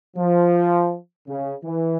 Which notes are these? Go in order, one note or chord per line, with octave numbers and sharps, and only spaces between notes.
F3
C#3
E3